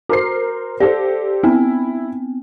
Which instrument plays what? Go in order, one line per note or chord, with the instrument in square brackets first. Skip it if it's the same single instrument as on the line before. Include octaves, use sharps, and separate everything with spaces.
[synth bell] F#4 [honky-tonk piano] A#4 C5 C7
[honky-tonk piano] G4 A4 C5 [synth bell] D5
[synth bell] B3 C4 [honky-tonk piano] E4